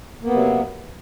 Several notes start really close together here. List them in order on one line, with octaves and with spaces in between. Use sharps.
A#3 B3 C3 F#3